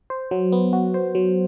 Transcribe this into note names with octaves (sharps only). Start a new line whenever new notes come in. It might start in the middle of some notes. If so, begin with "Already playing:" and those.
C5
F#3
B3
F#4
C5
F#3